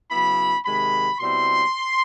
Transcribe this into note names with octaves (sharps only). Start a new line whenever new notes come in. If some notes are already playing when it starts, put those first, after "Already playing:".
C#3 F#3 B3 E4 B5
C3 D#3 G#3 B5
B2 G3 C4 E4 C6